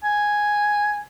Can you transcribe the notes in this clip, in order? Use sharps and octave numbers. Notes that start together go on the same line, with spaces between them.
G#5